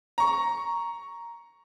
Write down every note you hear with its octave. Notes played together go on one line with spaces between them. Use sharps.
A#5 C#6